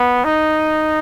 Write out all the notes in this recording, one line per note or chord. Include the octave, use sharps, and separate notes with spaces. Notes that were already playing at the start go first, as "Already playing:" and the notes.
Already playing: B3
D#4